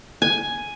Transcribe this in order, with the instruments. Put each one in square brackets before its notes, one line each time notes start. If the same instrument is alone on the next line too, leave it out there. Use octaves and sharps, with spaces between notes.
[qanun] G#5